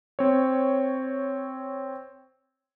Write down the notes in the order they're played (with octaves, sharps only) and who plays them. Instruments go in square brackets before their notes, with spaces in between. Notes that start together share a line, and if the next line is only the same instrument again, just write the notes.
[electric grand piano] C4 C#5